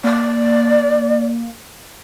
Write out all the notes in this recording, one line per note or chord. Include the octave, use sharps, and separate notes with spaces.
A#3 D5